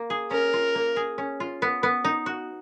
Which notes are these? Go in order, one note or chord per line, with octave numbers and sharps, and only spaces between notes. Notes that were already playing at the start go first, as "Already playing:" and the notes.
Already playing: A#3
G#4
C#4 A#4
F4
A#3
G#4
C#4
F4
B3
B3
D#4
F#4